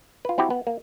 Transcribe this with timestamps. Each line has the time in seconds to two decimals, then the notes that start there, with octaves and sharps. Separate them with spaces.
0.25 F4 B4
0.38 C4 E4 F#4 G4
0.50 B3
0.67 A#3